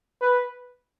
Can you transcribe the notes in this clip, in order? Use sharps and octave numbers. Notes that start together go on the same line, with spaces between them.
B4